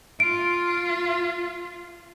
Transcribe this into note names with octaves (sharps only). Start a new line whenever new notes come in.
F4 D7